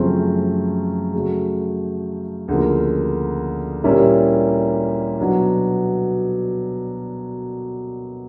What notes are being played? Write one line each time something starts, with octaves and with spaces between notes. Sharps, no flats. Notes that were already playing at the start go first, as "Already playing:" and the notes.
Already playing: F#2 C#3 F3 A3 C4
C#3 F#3 A3
D2 C#3 F3 A#3
A#2 G3 A#3 C#4 E4
B2 F#3 B3 D4